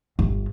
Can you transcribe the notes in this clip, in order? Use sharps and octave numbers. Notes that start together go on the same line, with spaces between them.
G1